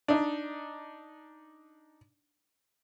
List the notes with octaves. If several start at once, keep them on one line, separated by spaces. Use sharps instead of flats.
D4 D#4